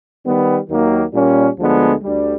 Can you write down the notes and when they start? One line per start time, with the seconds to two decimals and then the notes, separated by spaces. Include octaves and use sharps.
0.23 D#3 G3 B3
0.68 D#2 D#3 F#3 A#3
1.12 A#2 G3 A#3 C#4
1.58 D2 D3 F3 G#3 B3
2.02 D2 D3 G3